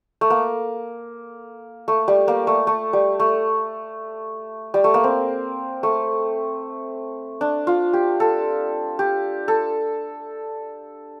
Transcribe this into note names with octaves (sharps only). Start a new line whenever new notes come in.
A3
A#3
A3
G3
A#3
A3
A3
G3
A3
G3
A3
A#3
C4
A3
D4
F4
G4
A4
G4
A4